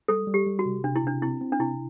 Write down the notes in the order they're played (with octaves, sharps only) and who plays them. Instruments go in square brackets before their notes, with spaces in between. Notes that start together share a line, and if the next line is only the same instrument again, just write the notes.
[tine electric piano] G3 [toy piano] A4
[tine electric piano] G3
[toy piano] G4
[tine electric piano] G3
[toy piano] F#4
[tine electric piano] C3
[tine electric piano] C3 [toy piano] D4
[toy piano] E4
[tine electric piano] C3 [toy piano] D4
[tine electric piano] C4 [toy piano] E4
[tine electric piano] C4
[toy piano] D4
[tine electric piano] C3 [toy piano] E4